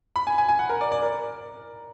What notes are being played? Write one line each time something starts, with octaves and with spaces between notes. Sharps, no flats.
B5
G#5
G#5
G#5
F#5
A#4
D5
D5
A#4